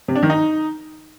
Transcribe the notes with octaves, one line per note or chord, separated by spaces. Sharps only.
C3
D4
D#3
D#4